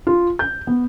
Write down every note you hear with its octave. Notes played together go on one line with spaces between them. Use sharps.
F4
G6
B3